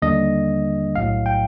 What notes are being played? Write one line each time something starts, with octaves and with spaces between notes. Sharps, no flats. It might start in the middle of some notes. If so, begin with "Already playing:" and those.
D#2 D3 G3 A#3 D4 D#5
B1 A2 F#3 F5
G5